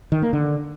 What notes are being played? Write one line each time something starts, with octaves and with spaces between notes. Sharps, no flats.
D#3
A#3
D3